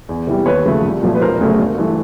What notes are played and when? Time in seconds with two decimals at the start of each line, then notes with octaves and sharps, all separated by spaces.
0.09 E2
0.27 C3 E3 G3
0.46 D#2 B4 C#5
0.66 C#3 F3 A3
0.85 C2
1.03 A#2 F3 A3
1.15 B4
1.21 E1 A#4 C5
1.40 D2 C#3 F#3 A3
1.59 G1
1.78 G2 E3 A3